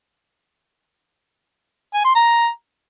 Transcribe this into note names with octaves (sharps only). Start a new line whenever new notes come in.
G#5
C6
A#5